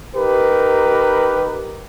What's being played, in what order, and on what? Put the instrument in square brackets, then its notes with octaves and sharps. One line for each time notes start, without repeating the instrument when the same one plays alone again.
[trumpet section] D#4 G4 A#4 B4